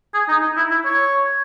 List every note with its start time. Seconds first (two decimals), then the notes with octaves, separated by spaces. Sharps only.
0.14 G#4
0.28 D#4
0.42 D#4
0.57 E4
0.71 E4
0.85 C#5